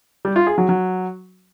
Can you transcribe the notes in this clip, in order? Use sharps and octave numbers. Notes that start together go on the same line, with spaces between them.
G3
F4
G#4
F#3
F#3